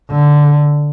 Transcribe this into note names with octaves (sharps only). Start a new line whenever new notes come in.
D3